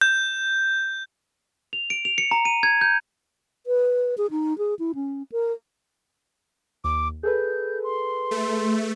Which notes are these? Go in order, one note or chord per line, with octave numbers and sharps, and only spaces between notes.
G6
F7
D7
F7
C#7
A#5
D#7
G#6
G6
B4
G#4
D#4
G#4
E4
C#4
A#4
D#2 D6
G#4 A4 B4 G6
C6
A3